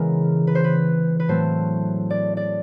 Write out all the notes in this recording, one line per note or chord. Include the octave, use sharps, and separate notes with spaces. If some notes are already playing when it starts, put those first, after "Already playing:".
Already playing: C#3 E3 G#3 B3 A#4
B4
C5
B4
B4
A2 F#3 A3 C4 C5
D5
D5